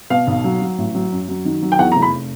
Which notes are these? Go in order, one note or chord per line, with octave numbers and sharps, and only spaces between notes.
B2 F5
B1
F#3
F#3
A1
F#3
F#2
F#3
D#3
F#3
G5
E2 F#5
F1 A#5
B5